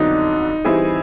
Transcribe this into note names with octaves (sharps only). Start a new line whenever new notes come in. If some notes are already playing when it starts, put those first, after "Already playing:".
Already playing: F2 D3 F#3 B3 D4 D#4
E3 G3 C4 E4 G#4